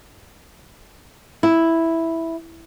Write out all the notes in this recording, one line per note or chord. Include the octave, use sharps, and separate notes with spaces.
E4